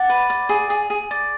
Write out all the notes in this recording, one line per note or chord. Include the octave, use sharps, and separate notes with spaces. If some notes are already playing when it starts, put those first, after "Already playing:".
Already playing: D5 F#5
B4
D5
G#4
G#4
G#4
D5